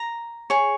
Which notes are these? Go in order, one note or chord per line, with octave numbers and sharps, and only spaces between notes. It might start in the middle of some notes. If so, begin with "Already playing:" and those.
Already playing: A#5
G#4 C#5